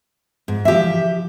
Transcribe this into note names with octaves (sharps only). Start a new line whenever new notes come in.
G#2
E3 F3 G4 E5